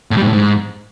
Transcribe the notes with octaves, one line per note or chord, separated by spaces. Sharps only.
A2
G3
G#2
A2
G#2